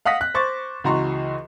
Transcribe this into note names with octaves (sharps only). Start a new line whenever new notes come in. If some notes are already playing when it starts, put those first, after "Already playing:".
F5 F#5 D#6 A#6 B6
F#6
C5 C#6 D6 A6
C#2 E3 F#4 A#5 C6 C#6